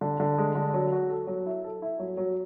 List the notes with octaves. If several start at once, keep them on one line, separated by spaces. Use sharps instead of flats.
D3
D3
G#3
D3
F#3
F#4
A4
F#3
E4
A4
E4
F#3
F#3